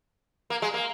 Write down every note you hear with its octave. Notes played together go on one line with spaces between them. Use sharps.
A#3
G#3
A#3